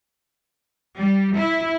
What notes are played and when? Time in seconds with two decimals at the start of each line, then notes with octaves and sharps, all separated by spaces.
0.98 G3
1.37 E4